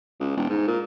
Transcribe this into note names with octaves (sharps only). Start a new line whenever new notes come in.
C#2
E1
G#2
A#2